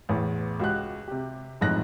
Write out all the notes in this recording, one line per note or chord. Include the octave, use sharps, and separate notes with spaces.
A1 E2
C#2 F#4 G4 F#6
C3 G4
D#1 A1 F2 G#2 F#6 A#6